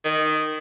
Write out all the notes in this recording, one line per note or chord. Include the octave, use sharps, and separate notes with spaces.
D#3